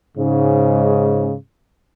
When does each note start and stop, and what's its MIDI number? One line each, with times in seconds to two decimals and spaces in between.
0.17 1.34 44
0.17 1.34 49